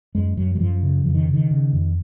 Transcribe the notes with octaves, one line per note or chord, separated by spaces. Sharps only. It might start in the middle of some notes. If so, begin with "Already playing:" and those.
F#2 G#3
F#2 F#3
F#3
F#2 F3
C#3
F2 F3
D#3
C#3
D#3
C#3
F2